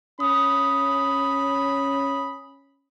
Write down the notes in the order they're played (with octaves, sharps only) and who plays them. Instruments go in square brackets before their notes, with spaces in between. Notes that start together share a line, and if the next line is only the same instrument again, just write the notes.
[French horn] C#4 [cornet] B5 [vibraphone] D#6